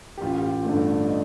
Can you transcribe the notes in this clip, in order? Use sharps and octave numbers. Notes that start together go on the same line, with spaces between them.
G4
A1 F4
G4
F4
G2 D3 A3
D5
D#5